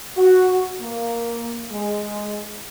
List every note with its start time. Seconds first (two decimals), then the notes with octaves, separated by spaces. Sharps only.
0.17 F#4
0.80 A#3
1.71 G#3